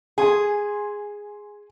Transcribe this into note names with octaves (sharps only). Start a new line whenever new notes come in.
G#4 G#5 C6